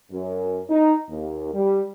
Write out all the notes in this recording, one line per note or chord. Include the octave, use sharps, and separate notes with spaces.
F#2
D#4
D#2
G3